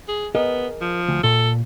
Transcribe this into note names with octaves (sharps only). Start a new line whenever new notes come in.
G#4
B3 G#4 A#4 D#5
F3
D2
A#2 A4